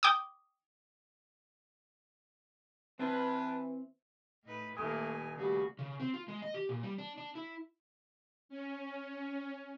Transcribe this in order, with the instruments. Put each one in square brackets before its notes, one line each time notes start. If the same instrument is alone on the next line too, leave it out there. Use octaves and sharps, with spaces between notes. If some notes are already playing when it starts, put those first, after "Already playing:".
[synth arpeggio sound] G5 D6 D#6
[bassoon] E3 [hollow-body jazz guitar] C4 [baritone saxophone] D4 [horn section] B4
[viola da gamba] A2 D#4 B4
[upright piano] D#1 D#6 [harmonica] A3 [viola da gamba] A#3 E4 G4 [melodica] G#5
[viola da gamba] C#3 A3 F#4 [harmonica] G3
[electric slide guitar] C#3
C4
F4
G#3
D#5
G4
A#2
G3
D4
D4
E4
[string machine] C#4